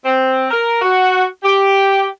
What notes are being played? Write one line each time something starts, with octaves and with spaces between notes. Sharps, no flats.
C4
A#4
F#4
G4